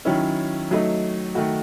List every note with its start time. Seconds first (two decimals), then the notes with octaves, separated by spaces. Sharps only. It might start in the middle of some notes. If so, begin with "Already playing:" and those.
0.05 D#3 F#3 C#4 E4
0.71 F#3 A3 D#4
1.35 D#3 A3 D#4 F#4